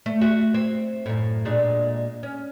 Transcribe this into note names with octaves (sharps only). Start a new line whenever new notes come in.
A3
F#4 E5
C4
F#2 A2
A#2 G#3 D4
C#4